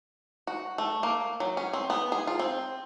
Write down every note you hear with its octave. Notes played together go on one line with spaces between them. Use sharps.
F#4
A3
A#3
F#3
C#4
C4
B3
G#4
F4
C4